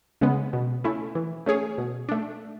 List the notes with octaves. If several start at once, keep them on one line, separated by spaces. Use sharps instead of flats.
C#3 G#3 B3
B2
A3 C#4 E4
E3
A3 C#4 G#4 C#5
B2
A3 D4